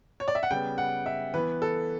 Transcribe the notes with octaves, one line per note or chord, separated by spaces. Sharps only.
C#5
D5
E5
F#5
C#3 G3 B3 G5
F#5
E5
E3 B3 B4
A4